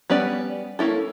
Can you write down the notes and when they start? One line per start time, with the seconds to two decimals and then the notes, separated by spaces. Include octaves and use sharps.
0.10 G3 B3 C#4 D5
0.79 A#3 C#4 E4 A4